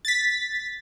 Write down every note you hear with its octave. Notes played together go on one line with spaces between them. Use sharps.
A6 B6